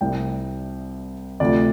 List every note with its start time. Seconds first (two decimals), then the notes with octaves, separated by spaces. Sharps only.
0.01 C2 C3 G3 G5
1.40 D2 C3 F3 D5